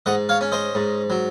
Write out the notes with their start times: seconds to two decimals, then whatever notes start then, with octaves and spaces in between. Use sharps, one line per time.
0.06 G#2 D#5 F#5
0.29 C#5 F5
0.41 C#4
0.52 C5 D#5
0.75 G#2
1.10 F#3